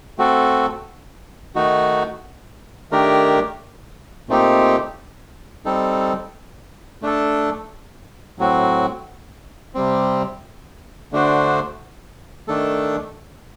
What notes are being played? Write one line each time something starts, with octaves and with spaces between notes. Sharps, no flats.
A3 C4 F#4 A4
D#3 A3 D#4 F#4
D#3 A3 D4 G4 A#4
A#2 A3 C4 D#4 G4
G3 C4 D#4 A4
A3 D4 A4
A2 F#3 C4 F#4
C3 G3 C4
D3 A3 D4 F#4 C5
D#3 A3 D4 A4